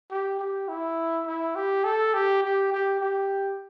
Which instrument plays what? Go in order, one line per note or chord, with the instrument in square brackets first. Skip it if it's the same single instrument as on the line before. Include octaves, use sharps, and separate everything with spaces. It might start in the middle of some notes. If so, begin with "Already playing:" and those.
[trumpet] G4
G4
E4
E4
G4
A4
G4
G4
G4
G4